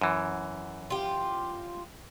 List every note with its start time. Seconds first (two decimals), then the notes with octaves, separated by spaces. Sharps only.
0.01 F#2 E3
0.90 F4 G4